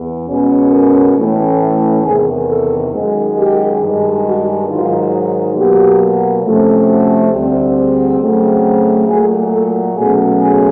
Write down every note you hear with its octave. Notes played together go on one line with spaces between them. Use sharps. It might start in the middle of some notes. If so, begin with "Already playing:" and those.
Already playing: E2
B2 G#3 C#4
A#4
A2 E3 A3 C#4
E2 C3 D#3 G#4
A4
F#2 D#3 G#3
G4
G2 D#3 G#3
F#4
G#2 D#3 F#3 F4
B2 F#3 A#3 G4
C3 F3 A3 C#4
F#4
D2 D3 G3 C4
G#4
C#3 F#3 A3 C4
A#2 F#3 A3 G#4
A4
B2 F#3 A3 C#4 G#4
G#4